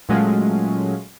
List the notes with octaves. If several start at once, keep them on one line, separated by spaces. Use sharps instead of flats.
A#2 F#3 G#3 A3 C#4 F4